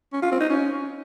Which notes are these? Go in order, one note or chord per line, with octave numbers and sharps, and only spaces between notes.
C#4
F4
C4
D#4
C#4